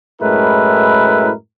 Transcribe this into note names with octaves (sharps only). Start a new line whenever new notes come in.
F#2 A2 G#3 E4 A#4 B4